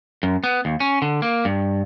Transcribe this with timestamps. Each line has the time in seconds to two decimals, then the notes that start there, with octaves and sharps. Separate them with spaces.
0.23 F#2
0.44 B3
0.65 D#2
0.80 C#4
1.02 D3
1.22 A#3
1.45 G2